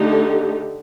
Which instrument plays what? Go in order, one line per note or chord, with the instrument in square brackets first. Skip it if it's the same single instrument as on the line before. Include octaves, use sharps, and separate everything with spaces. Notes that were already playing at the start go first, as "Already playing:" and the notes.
Already playing: [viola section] D3 A3 D#4 G4